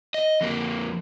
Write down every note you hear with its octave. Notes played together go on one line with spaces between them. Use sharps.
D#5
F2 A#3